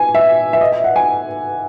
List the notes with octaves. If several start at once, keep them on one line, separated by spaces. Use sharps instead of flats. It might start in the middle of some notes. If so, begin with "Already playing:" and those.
Already playing: G#5
E5
E5
D#5
E5
F#5
G#5